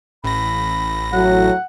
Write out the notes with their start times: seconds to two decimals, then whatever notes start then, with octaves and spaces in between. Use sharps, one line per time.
0.24 A1 B5 A#6
1.13 A2 F#3 F#5